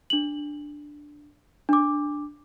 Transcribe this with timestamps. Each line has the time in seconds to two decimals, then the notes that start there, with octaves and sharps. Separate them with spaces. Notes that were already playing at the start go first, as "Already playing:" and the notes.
0.10 D4 F#7
1.69 D4 D6